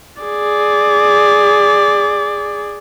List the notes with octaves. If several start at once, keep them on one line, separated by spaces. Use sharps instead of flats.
G#4 D5